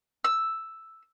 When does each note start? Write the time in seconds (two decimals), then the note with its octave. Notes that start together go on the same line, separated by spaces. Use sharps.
0.24 E6